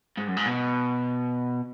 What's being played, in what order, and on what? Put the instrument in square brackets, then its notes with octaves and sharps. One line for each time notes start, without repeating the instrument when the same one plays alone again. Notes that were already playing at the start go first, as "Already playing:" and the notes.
[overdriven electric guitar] G#2
F#2
G#2
B2